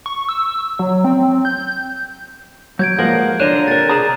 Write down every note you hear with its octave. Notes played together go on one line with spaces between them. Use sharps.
C#6
E6
F#3
C4
G6
F#3 G6 G#6 D7
F3 G#3 A#3 A#4 F5 F#5
D3 D4 F4 C#5 A#5 F#6 D#7 E7
C3 A#4 A6
G#4 D5 A#5 D#6 E7